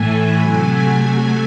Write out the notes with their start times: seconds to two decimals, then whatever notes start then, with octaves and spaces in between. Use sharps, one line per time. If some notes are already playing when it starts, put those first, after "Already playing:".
Already playing: A2 E3 A3 G#5
0.39 C3 F#3 A3